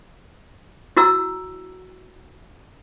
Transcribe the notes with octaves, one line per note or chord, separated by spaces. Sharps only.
E4 F#4 A#5 E6